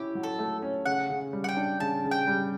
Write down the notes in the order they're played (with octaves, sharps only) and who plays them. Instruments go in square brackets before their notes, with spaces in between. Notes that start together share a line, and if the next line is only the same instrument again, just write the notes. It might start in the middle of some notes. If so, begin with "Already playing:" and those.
Already playing: [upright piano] C#4 E4 [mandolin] G4
[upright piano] F#3
[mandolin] A4
[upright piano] A3
C#4
[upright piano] C#3 [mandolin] F#5
[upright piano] C#3
G3
[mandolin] F#5
G5
[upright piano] D4
[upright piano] C#3 [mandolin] A5
[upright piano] C#3
[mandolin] G5
[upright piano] G3